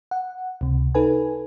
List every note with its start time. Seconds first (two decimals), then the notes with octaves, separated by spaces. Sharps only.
0.11 F#5
0.61 C#2 C3
0.95 D#4 A4 B4 G#5